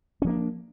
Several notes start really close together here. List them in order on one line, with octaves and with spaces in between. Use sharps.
C#4 F3 A#3 D4